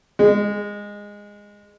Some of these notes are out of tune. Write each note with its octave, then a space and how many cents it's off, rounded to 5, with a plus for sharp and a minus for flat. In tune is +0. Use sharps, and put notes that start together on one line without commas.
G#3 -15